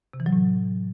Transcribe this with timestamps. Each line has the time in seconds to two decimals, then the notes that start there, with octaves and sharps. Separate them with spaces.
0.14 C3
0.20 E3
0.26 F#3
0.33 A2